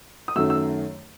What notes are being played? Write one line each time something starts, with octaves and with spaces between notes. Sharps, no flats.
D#6
F#2 D#3 F#3 A3 E6
E6